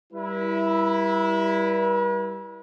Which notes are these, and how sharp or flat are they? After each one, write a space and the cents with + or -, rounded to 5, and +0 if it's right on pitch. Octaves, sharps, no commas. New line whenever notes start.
G3 +0 E4 +0 B4 -45